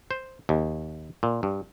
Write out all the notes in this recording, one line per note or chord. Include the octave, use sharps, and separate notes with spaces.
C5
D#2
A#2
G2